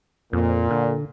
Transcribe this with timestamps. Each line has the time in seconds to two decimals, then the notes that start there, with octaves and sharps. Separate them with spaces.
0.33 F2 A#2
0.70 D3